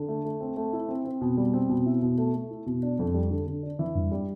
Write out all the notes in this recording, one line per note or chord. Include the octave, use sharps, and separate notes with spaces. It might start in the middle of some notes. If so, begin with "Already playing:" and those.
Already playing: D3
A3
A3
C4
A3
E4
C4
C4
B2
G3
C4
B2
E4
B2
A3
A3
E4
B2
D4
F2
G3
D3
D3
D4
E3
G2
G3